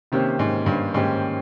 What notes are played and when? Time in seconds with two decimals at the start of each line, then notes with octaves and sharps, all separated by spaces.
0.12 C3 D#3 A#3 C#4 G4 C5
0.39 G#2
0.66 G2
0.94 G#2 D#3 A#3 C#4 G4 C5